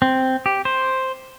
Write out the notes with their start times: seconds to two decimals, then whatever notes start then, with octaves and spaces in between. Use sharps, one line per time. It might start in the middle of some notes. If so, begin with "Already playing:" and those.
0.02 C4
0.46 G4
0.65 C5